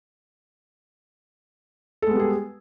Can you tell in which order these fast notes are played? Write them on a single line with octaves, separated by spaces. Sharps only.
A4 G#3 B3 G3 G#4